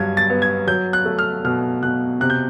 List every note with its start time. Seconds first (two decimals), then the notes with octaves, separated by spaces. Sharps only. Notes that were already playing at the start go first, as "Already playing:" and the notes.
Already playing: G2 F#3 G#6
0.17 A6
0.30 B3
0.42 G#6
0.67 F#3 G6
0.93 F#6
1.05 A3
1.19 F6
1.44 B2 F6
1.83 B2 F#6
2.21 C3 F#6
2.30 G6